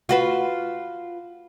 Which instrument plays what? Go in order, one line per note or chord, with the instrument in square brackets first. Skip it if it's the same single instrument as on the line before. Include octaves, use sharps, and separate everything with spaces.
[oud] F4 F#4 B4